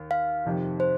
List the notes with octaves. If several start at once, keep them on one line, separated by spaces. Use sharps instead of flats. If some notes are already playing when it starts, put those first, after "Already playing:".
Already playing: D#2
F5
F2 C3 D#3
C5